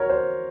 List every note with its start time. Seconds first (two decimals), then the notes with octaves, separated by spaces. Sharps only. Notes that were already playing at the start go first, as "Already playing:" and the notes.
Already playing: F#4 A#4 C#5
0.10 C5